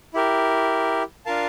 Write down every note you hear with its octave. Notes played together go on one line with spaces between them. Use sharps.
E4 G4 A#4
D4 F4 A#4 F5 A5